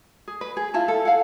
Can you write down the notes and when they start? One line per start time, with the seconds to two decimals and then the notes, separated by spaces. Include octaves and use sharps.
0.28 G#4
0.41 B4
0.57 G#4
0.74 E4 F4 A5
0.88 A4
1.05 F5 F#5